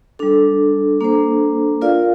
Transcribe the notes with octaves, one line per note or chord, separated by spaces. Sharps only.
G3 D4 A4
A#3 D4 A4 C5
F4 A#4 D5 F5